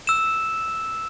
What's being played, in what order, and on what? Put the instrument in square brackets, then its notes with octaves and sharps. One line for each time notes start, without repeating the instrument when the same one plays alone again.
[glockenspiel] E6 E7